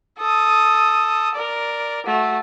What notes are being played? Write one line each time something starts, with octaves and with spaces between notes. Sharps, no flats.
A4 D#6
A#4 D5
A3 F#4